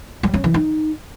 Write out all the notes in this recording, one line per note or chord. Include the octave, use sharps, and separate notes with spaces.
G3
C#4
E3
D#4